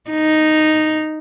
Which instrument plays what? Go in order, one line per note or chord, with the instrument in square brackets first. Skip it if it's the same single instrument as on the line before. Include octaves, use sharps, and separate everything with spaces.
[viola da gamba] D#4